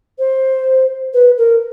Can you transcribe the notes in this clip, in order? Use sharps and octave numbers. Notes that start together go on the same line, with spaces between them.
C5
B4
A#4